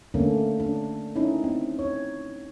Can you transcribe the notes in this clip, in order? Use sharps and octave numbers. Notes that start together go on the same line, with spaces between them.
D3 A3 A#3 C#4 D4
D4
C#4 D#4 E4
C4
C#5